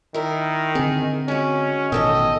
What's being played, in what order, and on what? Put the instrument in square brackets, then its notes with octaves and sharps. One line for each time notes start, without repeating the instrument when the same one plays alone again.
[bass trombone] D#3 [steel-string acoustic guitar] E4 A#4
[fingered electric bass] D3 C4 [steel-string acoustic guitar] G#4
[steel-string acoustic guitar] G#3 F#4 [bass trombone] C#4
[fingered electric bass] A1 B2 [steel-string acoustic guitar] D#3 A4 G5 [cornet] D#5